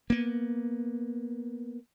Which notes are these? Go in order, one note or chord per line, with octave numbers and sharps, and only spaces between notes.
A#3 B3